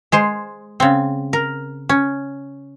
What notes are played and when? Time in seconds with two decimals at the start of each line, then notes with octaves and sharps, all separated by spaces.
0.12 G#3 G#4 C5
0.80 C#3 C4
1.33 A#4
1.89 C#4